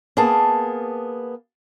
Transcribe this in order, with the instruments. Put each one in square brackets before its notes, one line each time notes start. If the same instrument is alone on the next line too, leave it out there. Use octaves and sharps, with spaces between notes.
[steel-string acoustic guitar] A#3 B3 G#4 A5